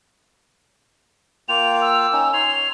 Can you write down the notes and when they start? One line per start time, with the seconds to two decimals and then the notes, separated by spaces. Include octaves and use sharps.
1.49 A#3 F4 G5 F7
1.82 E6
2.13 C#4 D#4
2.33 C#5 C6 F7